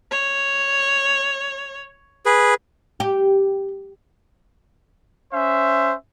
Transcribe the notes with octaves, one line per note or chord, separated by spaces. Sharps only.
C#5
G#4 B4
G4
C#4 C5 E5